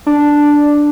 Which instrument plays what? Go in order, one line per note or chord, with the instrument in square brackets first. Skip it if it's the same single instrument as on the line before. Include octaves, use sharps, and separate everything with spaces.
[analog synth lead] D4